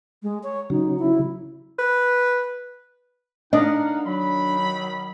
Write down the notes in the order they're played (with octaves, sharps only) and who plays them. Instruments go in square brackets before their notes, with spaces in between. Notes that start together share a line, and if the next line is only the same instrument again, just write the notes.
[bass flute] G#3
C#5
[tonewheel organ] C#3 F#3 [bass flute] D#4
[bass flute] E4
[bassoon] B4
[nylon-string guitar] D4 [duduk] D#4 [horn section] A#4 F5 F#5 [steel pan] D#5
[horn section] D#3 B5 [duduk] F#3